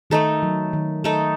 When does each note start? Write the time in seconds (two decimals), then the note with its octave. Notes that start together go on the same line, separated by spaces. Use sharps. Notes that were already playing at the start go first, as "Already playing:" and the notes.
0.10 D#3 A3 D#4 A4
0.43 F#3
0.73 D#3
1.04 A3 D#4 A4